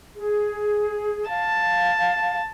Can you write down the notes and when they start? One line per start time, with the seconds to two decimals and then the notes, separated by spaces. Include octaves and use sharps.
0.15 G#4
1.29 F5 A5